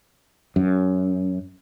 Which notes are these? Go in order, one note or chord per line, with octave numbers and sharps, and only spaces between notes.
F#2